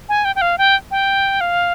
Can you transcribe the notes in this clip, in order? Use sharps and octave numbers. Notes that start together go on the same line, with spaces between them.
G#5
G5
G5
F5
G5
G5
F5